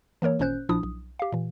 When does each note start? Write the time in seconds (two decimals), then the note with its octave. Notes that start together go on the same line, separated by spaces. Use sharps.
0.22 E3 A#3 A#4 C#5
0.39 G#1 A#2 C#4 C5 F#6 G6
0.69 A#1 A#2 F3 D4 E4 D#6
0.83 B1
1.19 G4 F5
1.32 A#2 E3